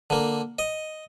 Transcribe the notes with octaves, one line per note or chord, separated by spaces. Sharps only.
D3 A#3
D#5